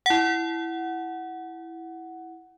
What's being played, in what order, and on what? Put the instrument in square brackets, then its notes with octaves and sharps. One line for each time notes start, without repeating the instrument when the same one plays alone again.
[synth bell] E4 F#5